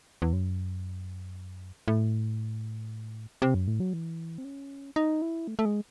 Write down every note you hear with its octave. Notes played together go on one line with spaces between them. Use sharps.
E2
F#2
A2
C3
F#2
A2
F#3
E3
C4
C#4
D#4
E4
A3
A3
G#3